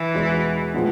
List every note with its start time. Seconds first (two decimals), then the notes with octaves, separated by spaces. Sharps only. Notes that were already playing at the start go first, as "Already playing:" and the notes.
Already playing: E3
0.14 E2 B2 G#3 B3
0.74 A2 F3 G#3 B3 D4